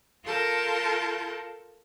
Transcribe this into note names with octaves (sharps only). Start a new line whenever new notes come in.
F4 A4 A#4 A5 G6